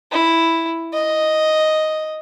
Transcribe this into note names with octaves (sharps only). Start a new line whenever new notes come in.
E4
D#5